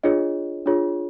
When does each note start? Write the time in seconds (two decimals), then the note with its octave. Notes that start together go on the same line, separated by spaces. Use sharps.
0.03 D4 F4 G#4 C#5 D#5
0.66 D4 F4 G#4 C#5